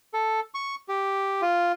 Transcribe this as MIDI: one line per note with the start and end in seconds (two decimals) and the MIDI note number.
0.14 0.40 69
0.54 0.75 85
0.89 1.41 67
1.42 1.72 65